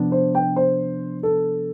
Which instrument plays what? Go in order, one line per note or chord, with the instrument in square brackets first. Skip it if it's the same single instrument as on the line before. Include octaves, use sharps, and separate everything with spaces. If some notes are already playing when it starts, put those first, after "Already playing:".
Already playing: [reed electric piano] C3 F3 B3 D4
[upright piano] C5
G5
C5
A4